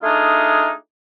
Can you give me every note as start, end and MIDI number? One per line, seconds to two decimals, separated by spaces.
0.03 0.70 57
0.03 0.70 62
0.03 0.70 63
0.03 0.70 65
0.03 0.70 68